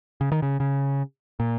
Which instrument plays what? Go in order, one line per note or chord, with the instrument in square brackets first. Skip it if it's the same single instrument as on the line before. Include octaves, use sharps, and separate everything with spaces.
[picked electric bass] C#3
D#3
C#3
C#3
A#2